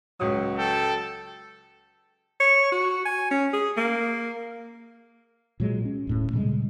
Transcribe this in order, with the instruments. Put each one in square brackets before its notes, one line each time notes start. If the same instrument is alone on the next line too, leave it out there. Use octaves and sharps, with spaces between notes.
[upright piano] C#2 D#6 [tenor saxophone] F#3
[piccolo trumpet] A4 [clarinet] G5
[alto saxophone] C#5
F#4
G#5
C#4
G#4
A#3
[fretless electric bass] A#2 F#3 G#3
C#4
D1 A2 C#4
A#2 C#3 G3 G#3